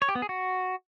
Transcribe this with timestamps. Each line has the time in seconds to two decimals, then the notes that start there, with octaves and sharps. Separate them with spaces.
0.02 C#5
0.09 G4
0.15 B3
0.22 G#4
0.29 F#4